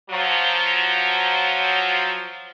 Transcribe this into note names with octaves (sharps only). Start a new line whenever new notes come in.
F3 F#3